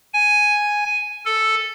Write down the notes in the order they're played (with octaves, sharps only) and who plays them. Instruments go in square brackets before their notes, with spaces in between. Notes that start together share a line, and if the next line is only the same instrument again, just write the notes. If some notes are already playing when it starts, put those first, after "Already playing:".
[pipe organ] G#5
A4